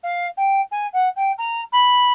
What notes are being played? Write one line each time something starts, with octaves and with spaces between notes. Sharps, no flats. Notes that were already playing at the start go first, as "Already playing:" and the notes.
F5
G5
G#5
F#5
G5
A#5
B5